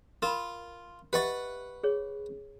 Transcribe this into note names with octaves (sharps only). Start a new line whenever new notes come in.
F4 A#4 B5
G4 B4 D#5 E5 F#5 C#6
G#4 C#5